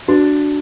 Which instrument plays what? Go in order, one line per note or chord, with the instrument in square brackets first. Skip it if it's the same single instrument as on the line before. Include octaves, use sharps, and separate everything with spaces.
[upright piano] D4 [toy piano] F#4